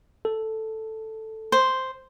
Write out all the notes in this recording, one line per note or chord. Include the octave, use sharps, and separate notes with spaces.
A4
C5